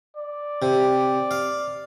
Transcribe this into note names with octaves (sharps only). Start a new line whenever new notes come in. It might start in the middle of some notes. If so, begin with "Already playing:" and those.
D5
C3
F5